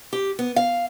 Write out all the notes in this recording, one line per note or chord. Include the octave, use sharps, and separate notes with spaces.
G4
B3
F5